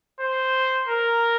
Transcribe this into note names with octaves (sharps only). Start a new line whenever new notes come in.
C5
A#4